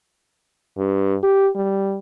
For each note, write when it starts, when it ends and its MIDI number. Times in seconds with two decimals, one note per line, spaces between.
0.78 1.16 43
1.23 1.49 67
1.55 1.99 55